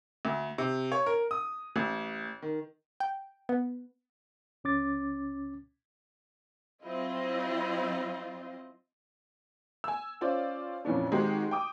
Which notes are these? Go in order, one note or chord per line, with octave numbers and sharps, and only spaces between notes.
D2
C3
C#5
A#4
D#6
A1
D#3
G5
B3
C#2 C#4 D6 A6
F#3 C4 E4 F4 D#5
G#5 E6
C#4 F4 C5 D5
F2 A#2 E3 C#4 D4
D#3 G#3 C4 D#4 F#4 G4
G5 D6 D#6